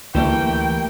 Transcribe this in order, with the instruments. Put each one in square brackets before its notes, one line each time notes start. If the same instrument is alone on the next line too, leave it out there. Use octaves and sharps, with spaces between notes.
[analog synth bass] D2 [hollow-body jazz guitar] E3 [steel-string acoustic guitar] G3 A3 A#3 [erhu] G5